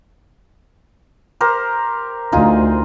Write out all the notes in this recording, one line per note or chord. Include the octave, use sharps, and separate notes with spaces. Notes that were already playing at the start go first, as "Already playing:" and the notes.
G4 A#4 C5
D2 D#4 F4 G#4